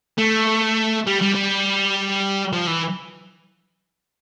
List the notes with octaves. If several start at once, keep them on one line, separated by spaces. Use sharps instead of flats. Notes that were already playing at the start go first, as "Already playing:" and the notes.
A3
G3
G3
G3
F3
E3